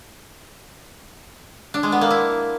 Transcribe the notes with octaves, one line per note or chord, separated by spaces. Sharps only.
D4
G#3
B3
A#3
E4